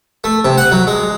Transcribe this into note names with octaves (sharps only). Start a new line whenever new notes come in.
A3
C3
F#5
F#3
G#3